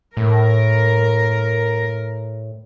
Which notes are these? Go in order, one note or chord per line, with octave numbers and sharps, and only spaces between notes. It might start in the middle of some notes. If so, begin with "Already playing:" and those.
A2 A#4